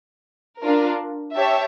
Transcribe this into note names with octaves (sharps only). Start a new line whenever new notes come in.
D4 F4 A#4
G4 C#5 E5 A5